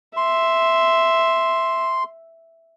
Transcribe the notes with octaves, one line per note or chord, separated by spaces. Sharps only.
E5 C6